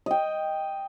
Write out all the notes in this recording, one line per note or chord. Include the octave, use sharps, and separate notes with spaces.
D#5 G5